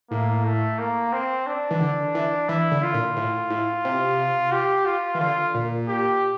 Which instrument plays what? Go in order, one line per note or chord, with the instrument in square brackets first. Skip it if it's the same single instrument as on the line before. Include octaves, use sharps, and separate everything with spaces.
[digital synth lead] A2 [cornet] A#3
[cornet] A3
A#3
C4
D4
[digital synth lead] E3
D3
E3
[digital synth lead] E3 [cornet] E4
[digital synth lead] D3
[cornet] F4
[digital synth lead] A#2
A2
A2
C3
[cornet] G4
F4
[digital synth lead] E3
[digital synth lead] D3 [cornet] F4
[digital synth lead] A#2
[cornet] G4